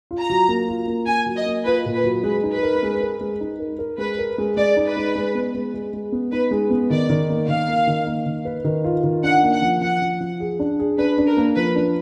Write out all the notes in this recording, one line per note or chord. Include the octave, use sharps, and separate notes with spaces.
F4
A#5
F#3
A#3
F4
A#3
A#3 G#5
F#3
D#5
A#3
F4 B4
A#2
B4
F#3
G#3 B4
D#4
B4
A#4
G#3
A#4
G#3
D#4
A#4
A#4
G#3 B4
A#4
G#3
G#3 D5
D#4
B4
G#3
G#3
B3
G#3
G#3
G#3
B3
D#4 B4
G#3
B3
D#3 D5
D#3
A#3
D#3 F5
A#3
D#3
A#3
D#3
B4
D#3
F4
D#3
D4 F#5
A#3
F#5
F3
F3 F#5
F3
F3
G#4
D4
G#4
D4 B4
D4
A#4
A#3
F3 B4
D4